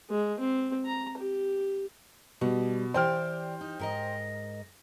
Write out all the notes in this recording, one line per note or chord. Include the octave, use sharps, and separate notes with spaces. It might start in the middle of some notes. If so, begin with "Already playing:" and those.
G#3
C4
A#5
G4
B2 G3
E3 G4 C5 D5 G5 F6
D#4
G#2 A#4 D#5